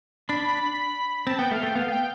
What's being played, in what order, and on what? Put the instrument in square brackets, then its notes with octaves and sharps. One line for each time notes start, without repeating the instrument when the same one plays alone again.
[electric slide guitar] D4 [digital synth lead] B5
[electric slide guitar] C4 [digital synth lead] A5
[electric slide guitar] B3 [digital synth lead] G5
[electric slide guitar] A3 [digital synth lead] F5
[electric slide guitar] A3 [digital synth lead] G5
[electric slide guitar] B3 [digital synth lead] F5
[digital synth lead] G5